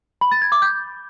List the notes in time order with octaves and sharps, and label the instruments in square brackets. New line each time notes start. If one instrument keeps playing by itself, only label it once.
[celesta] B5
A6
G#6
D6
G6